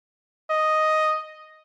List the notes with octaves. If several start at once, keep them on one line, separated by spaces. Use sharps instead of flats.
D#5